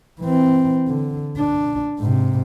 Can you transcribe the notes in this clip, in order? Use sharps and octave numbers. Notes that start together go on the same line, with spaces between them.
E3 C4
D3
D4
G#2 C3